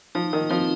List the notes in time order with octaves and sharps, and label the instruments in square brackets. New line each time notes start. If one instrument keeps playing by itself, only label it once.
[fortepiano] F3 [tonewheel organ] D#4
[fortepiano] D#3
[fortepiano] F3 [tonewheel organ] C4